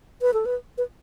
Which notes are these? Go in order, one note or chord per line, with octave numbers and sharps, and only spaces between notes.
B4
A4
B4
B4